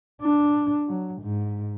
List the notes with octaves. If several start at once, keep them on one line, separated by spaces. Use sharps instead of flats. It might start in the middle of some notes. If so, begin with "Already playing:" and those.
D4
F#3
G#2